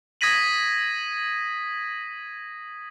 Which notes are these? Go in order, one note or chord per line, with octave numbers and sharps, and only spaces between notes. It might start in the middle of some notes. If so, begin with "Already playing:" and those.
D#6 G#6 A#6 B6 D#7 F#7